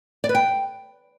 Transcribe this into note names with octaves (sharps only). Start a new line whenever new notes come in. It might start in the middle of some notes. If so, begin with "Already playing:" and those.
D5
B4
G5